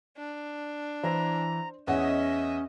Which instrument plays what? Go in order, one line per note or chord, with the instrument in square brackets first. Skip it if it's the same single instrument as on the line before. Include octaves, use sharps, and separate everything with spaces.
[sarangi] D4
[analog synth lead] E3 [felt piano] C5 [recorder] A#5
[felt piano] E2 C#5 F#5 [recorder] C#4 [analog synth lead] D#5 [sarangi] E5